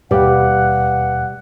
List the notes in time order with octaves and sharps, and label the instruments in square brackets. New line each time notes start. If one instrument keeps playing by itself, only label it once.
[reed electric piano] D#2 B2 D6 [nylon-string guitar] G3 [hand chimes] B4 F5 [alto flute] F#5